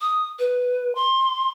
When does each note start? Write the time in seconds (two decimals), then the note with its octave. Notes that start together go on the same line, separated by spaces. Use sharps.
0.01 D#6
0.39 B4
0.95 C6